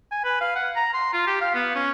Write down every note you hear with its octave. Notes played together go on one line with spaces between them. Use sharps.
G#5
B4
F5
F#5
A#5
C6
F4
G4
F5
B3
C#4